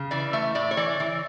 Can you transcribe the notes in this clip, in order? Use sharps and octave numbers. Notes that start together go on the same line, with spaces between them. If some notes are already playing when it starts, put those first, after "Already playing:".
Already playing: C#3
E3 D5
A3 E5
A2 D5
C#5
E3 D5
E3